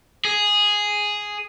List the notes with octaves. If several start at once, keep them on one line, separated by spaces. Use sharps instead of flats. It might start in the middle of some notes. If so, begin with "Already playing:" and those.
G#4